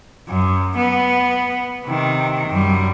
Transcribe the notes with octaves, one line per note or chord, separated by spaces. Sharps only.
F#2
B3
C3 D#3
F#2 G3